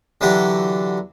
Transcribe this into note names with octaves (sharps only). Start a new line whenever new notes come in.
D3 E3 F#3 D4 G4